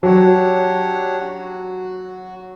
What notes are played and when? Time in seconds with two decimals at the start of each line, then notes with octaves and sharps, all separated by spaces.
0.03 F#3 D4 G4 C#5 F#5
1.19 F#4